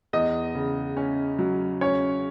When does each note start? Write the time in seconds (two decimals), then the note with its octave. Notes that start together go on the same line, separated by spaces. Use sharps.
0.13 E2 D#5
0.55 C#3
0.97 C#4
1.39 F#3
1.81 C#4 C#5